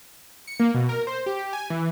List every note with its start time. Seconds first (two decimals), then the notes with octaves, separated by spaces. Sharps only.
0.47 C#7
0.60 A#3
0.74 B2
0.89 A#4
1.07 C5
1.26 G4
1.53 G#5
1.70 E3